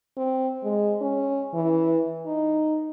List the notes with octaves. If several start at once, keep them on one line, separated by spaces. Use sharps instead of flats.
C4
G#3
C#4
E3
D#4